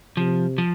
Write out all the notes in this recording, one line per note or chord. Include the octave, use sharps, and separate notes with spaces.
C3 F3
F3